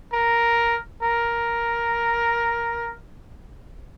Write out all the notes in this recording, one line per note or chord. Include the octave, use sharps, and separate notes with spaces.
A#4
A#4